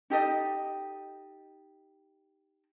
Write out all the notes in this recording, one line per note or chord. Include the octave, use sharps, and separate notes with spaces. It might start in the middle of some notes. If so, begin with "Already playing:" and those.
D#4 G4 A4 D#5